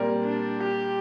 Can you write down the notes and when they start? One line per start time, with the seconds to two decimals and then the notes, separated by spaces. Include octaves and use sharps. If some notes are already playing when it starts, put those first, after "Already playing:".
Already playing: A#2 G3 C4 A#4 D5
0.24 D4
0.61 G4